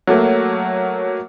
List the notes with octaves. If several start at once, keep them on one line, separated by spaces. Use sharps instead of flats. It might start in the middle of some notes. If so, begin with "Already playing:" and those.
F#3 A3 A#3